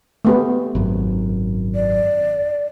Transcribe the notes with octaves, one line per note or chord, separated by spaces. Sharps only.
A3 B3 G4
G#1 F#2
D5